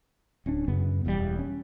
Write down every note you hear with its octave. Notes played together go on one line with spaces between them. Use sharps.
D1 C#4 D4
F#2 C#3 B3
E1 E2 C3 G3
C#4